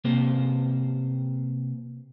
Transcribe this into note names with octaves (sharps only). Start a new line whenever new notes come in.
C3 A#3 C#4 C5 C6